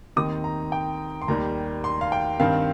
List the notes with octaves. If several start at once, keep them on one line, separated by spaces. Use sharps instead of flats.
D#2 D#3 C4 D#4 D#6
A#5
G5
C6
D#2 D#3 G3 A#5
C6
F5
G5
G2 D#3 C4 F5